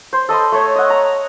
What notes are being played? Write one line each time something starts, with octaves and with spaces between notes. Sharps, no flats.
C5
A4 D#5 B5 C6
A3 C#5
D#5 F#5
A#5